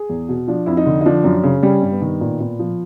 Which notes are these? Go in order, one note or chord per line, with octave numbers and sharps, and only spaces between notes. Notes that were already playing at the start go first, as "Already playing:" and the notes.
Already playing: G#4
E2
B2
F3 D4
F2 E4
D#4
D3
D#4
F3 D4
F#2
C#3
G3 C#4
G2
B3
D#3
A#2
A#2
F3